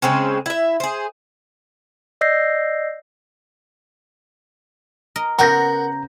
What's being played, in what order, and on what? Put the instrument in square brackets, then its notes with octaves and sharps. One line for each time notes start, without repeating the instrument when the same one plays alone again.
[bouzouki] C#3 G#3 C4 C#4
E4 E5
G#4 C5
[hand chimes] D5 D#5 E6 G6 A#6 C7
[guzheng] A#4 D#5
[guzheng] C#3 B3 F#4 [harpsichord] A#4 [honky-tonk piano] F#5 G6 A#6 [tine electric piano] A#5